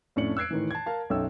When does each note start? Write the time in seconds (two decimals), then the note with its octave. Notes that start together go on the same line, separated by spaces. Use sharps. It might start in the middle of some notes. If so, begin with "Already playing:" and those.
0.16 F2 A2 C#4 D4 C#7 F#7
0.37 E6 F#6 G#6 C7 D7
0.51 A2 D#3 E3
0.71 A5 G#6
0.86 A#4 F5 A5
1.10 B1 F#2 A4 E5 G5 E6